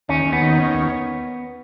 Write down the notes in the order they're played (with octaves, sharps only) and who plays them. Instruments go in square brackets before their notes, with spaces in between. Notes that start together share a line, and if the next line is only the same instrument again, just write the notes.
[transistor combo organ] D#2 [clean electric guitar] C#4
[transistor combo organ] D#2
[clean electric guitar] B3
[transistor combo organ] D#3
C#4
D#2